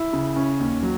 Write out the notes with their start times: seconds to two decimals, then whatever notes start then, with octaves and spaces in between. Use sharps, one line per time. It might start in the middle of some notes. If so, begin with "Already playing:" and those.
Already playing: E4
0.13 C#3
0.36 C#4
0.59 D#2
0.83 F#3